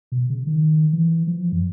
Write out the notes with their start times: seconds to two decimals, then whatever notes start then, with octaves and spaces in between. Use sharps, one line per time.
0.12 B2
0.30 C#3
0.47 D#3
0.93 E3
1.27 F3
1.52 F#2